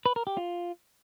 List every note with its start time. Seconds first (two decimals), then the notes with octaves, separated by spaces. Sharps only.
0.06 B4
0.16 A#4
0.27 G4
0.37 F4